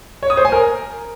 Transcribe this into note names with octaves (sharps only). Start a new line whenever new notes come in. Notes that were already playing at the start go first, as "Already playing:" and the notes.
C#5
D#6
C5
G#5
A#4